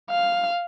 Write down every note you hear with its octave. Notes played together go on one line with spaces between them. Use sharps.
F5